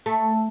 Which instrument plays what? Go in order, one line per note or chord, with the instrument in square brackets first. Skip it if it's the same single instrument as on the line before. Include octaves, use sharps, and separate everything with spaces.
[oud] A3